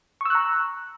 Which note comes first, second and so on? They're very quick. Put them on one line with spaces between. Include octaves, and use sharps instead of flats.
C#6 E6 F#6 A#5